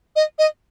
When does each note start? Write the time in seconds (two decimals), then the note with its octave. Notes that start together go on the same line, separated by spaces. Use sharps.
0.16 D#5
0.39 D#5